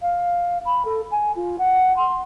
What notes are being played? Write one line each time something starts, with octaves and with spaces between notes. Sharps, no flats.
F5
B5
A4
G#5
F4
F#5
C6